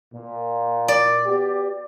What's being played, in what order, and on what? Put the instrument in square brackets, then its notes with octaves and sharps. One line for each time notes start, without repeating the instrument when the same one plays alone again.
[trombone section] A#2
[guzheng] D5
[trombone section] B3 F#4 G4